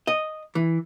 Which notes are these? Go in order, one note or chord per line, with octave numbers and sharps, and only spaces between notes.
D#5
E3